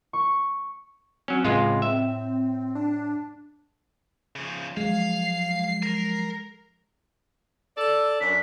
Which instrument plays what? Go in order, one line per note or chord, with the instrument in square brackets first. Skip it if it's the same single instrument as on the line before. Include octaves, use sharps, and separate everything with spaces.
[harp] C#6
[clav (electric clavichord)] F#3 C#4 [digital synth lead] C4
[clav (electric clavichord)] C#2 G#3 F4 [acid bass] A2
[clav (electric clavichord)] E5
[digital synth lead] D4
[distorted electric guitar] C#3 F3
[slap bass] F3 F#3 [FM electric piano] G#3 [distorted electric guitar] F5 [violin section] C7
[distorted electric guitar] A#4
[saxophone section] A4 D5 [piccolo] E6
[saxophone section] F#2 D4 [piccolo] B6